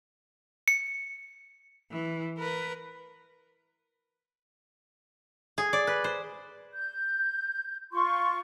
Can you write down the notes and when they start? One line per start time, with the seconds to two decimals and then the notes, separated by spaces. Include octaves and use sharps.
0.68 C#7
1.91 E3
2.38 A#4 B4
5.58 G#4
5.73 D5
5.87 B4
6.04 C5
6.72 G6
7.93 F4 C6 C#6